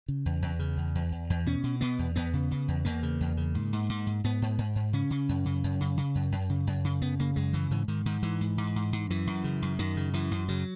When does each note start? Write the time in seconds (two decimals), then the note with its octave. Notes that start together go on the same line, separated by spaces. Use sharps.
0.08 C#3
0.26 E2
0.42 E2
0.59 C#3
0.77 E2
0.95 E2
1.12 E2
1.30 E2
1.46 B2 C#4
1.63 B2
1.81 B2 B3
1.99 E2
2.16 E2 B3
2.33 C#3
2.51 C#3
2.68 E2
2.85 E2 A#3
3.03 C#3
3.21 E2
3.37 C#3
3.55 G#2
3.73 G#2
3.89 G#2
4.07 G#2
4.24 G#2 B3
4.42 G#2
4.58 G#2
4.76 G#2
4.93 C#3 C#4
5.11 C#3
5.29 F#2
5.45 C#3
5.64 F#2
5.80 C#3
5.97 C#3
6.15 F#2
6.32 F#2
6.49 C#3
6.67 F#2
6.84 C#3
7.02 F#2 B3
7.20 C#3 A#3
7.36 F#2 G#3
7.53 C#3 E3
7.71 G#2 E3
7.88 G#2 D#3
8.06 G#2 D#3
8.23 G#2 E3
8.41 G#2
8.58 G#2
8.76 G#2
8.93 G#2
9.10 F#2 E3
9.27 F#2
9.44 C#3
9.62 F#2
9.79 F#2 D#3
9.97 C#3
10.13 F#2 E3
10.31 F#2
10.48 C#3 F#3